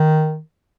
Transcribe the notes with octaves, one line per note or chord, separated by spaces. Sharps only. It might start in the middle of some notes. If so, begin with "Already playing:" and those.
Already playing: D#3